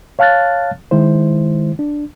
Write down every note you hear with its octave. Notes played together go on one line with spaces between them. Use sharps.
C#5 F5 A5 F6 F#6 A6
D#3 G#3 E4 C5
D4